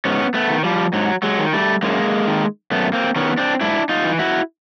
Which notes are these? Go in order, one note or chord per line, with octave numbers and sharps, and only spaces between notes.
G#2 B3 C#4
A3 B3
D#3
F3 G3
G#2 F#3
F#3 G#3
D#3
G3 A3
F#2 G#3 A#3
D#3
F#2 A3 B3
A#3 C4
D#3 B3 C#4
C4 D4
G#2 D4 E4
D#4 F4
E3
E4 F#4